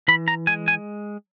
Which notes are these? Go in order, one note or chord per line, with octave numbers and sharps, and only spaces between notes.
E3 B5
A#5
G#3 G#5
G#5